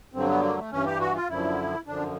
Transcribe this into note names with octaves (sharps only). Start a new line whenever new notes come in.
G2 D3 F#3 C4
B3
A#3
A3
G2 E3 C#4
G4
F#4
F4
F#2 D3 F3 E4
F#2 D3 F3 D4